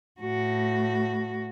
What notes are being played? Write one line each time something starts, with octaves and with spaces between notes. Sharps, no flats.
A2 F#4